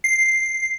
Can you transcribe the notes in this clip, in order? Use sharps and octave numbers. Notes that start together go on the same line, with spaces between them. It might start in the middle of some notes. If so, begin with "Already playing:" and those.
C7